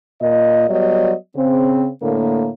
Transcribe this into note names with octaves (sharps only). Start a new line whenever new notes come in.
A#2 D#5
F#3 G3 B3 D5 D#5
C#3 C4
A2 D3 A#3